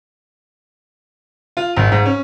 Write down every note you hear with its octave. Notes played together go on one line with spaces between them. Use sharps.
F4
G#1
G#2
C#4